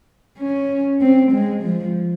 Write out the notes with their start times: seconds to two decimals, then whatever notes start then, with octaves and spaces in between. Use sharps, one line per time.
0.38 C#4
1.01 C4
1.32 G#3
1.62 F3